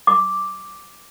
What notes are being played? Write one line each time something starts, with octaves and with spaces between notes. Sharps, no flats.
D6